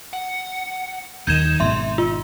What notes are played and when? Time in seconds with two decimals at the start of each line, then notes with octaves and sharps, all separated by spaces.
0.13 F#5
1.27 D#1 D#2 D#3 D#4 G6 G#6 E7
1.60 G#1 G#2 B2 E5 C6
1.98 F4